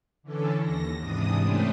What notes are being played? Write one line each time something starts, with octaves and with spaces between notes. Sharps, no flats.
D3 E3 C#4 D4 A4
D#2 A#6
G#2 C3 E3 D4 D#6
A3 C#4 D4 G4 B4 C5